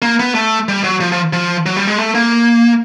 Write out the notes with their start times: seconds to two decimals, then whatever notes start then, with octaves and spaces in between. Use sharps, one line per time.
0.02 A#3
0.20 B3
0.35 A3
0.68 G3
0.84 F#3
1.00 F3
1.12 F3
1.33 F3
1.66 F#3
1.76 G3
1.87 G#3
1.98 A3
2.15 A#3